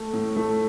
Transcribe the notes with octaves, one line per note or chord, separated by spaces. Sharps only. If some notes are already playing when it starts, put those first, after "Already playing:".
Already playing: A3
A2
A3